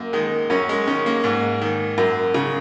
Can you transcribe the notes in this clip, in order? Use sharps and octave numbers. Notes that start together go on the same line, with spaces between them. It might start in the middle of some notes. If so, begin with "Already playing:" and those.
Already playing: F#2 A#3
D#3 G#3
F#2 C#4
G#3
D#3 C#4
A#3
G#2
D#3
F#2
C#3